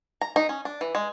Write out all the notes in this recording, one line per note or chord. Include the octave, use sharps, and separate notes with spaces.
A#5
D#4
C#4
D4
E3
G#3